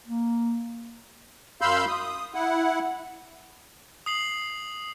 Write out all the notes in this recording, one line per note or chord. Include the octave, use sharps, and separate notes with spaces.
A#3
F#2 F5 B5 C6 E6 G6
D#6
E4 F#5
D#6 C7 F#7